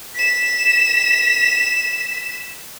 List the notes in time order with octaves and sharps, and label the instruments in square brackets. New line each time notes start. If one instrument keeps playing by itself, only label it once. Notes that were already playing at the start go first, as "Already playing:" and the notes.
[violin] B6 E7